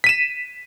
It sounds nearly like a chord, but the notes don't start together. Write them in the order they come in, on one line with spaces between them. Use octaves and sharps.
B6 D#7 E7